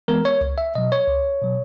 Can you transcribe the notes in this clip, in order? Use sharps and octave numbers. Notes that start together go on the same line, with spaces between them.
E3 G#3 B3 A#4
C#5
C#2
E5
B2 F#3 D#5
C#5
C#2
B2 F#3